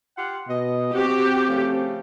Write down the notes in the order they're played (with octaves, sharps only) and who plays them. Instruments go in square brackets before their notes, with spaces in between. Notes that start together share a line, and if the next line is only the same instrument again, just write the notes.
[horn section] F4 G4 F#5
[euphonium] B2 [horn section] D#5
[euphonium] C4 [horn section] F#4 [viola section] G4
[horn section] C#3 F3 A3